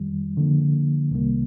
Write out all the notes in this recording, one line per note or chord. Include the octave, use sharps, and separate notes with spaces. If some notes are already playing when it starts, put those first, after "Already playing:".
Already playing: F2 D#3 G3
D3 F3 A#3
C2 C3 D#3 G3 A#3